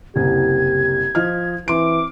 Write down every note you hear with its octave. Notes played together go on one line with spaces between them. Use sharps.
F#1 C2 G4 G#6
F3 D#5 F6
E3 C4 C6 D6 D7